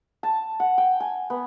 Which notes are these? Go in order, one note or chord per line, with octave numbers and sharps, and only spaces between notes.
A5
F#5
G5
G#5
B3